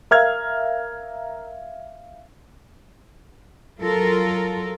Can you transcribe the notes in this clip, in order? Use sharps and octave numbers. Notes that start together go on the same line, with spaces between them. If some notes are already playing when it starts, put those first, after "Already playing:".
A#4 E5 F5 F6 G#6
F#3 F4 A4 A#4